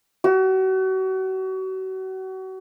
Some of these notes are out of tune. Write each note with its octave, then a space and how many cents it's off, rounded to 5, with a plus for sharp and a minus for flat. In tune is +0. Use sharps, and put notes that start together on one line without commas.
F#4 +35